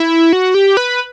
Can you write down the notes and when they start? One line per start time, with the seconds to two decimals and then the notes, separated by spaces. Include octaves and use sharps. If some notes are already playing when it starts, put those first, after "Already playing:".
Already playing: E4
0.33 F#4
0.54 G4
0.77 B4